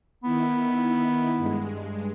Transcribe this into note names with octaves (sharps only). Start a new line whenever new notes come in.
D#3 B3 E4
G2 G#3